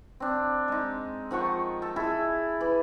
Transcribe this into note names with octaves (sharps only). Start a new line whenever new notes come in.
C4 D4
G#3 D#4
D#3 F3 F#5 C#6
A4
E4 G#4 A4
E3